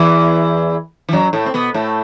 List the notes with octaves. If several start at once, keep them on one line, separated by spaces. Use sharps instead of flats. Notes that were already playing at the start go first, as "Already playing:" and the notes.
Already playing: E2 E3
E3
F#2 F#3
A2 A3
C4
B2 B3
A2 A3